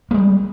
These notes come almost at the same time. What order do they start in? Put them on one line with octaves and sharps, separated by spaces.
A#3 G#3 G3